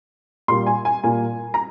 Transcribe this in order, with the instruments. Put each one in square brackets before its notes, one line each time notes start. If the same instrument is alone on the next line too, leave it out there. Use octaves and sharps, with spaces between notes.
[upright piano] A#2 G3 A#3 C6
G#5
G#5
A#2 G3 A#3 G#5
A#5